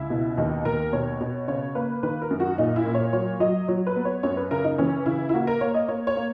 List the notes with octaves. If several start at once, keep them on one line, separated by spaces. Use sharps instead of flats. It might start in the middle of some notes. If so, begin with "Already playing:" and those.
Already playing: C#2 E4
B2
D#2 D#4
D#2 A#4
B2 C#5
B2
C#3 C#5
A#3 B4
D#3 B4
A#4
F#2
F#4
A#2 D#4
E4
A#2
C#5
F#3 C#5
F#3 D#5
F#3 C#5
B4
B3
C#5
F#2 C#5
B4
C#3 A#4
D#4
E3 C#4
C#3 E4
E4
A#3 F#4
A#4
A#3 C#5
D#5
A#3 C#5
C#5
A#3